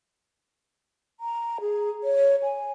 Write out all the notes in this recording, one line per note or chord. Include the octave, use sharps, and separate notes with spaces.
A#5
G#4
C#5
G#5